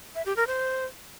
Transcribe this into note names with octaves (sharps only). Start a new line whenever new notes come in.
E5
G4
A#4
C5